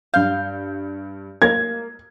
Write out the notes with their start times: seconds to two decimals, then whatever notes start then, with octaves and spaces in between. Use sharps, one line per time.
0.14 G2 F5 G6
1.42 A#3 A#4 G#6